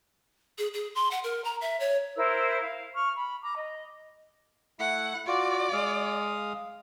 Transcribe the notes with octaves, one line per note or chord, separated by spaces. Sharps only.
G#4
G#4
C6
F#5
A#4
A#5
E5
C#5
E4 A#4 C5 E6
F5
C#6 F6
B5
A#5 D6
D#5
A3 E4 F#5
F4 F#4 D5
G#3 F5 D#6